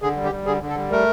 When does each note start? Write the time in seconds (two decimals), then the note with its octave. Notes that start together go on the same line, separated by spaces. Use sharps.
0.02 D3 G#4
0.16 G3
0.25 G4
0.31 G3
0.46 D3 G#4
0.62 D3
0.69 A4
0.76 G3
0.91 A3 A#4